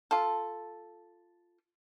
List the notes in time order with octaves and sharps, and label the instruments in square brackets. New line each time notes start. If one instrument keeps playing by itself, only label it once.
[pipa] F4 A4